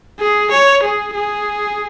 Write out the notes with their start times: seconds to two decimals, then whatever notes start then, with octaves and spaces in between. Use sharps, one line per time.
0.20 G#4
0.51 C#5
0.83 G#4
1.14 G#4